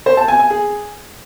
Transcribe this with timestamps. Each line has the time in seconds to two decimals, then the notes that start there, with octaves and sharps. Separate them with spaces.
0.06 C5
0.17 A5
0.28 G#5
0.39 G#5
0.50 G#4